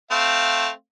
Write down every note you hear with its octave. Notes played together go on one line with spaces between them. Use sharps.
A3 C4 F5